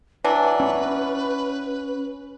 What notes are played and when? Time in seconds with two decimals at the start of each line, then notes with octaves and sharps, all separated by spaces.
0.24 E3 F#3 D4 B4
0.60 C#4